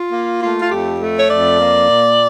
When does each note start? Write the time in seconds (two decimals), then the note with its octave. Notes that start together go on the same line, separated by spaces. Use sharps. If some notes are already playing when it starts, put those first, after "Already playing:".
Already playing: F4
0.11 A#3
0.40 A3 F4
0.61 F4
0.70 F2 G4
0.98 A3
1.18 C#5
1.28 F2 D5
1.58 A#3
1.87 A#2